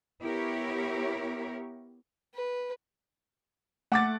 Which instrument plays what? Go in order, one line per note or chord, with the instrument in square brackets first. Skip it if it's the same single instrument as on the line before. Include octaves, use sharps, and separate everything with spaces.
[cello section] B3 E4 G4 A#4 C#5
[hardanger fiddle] B4
[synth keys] A3 [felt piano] F#5 D6 A6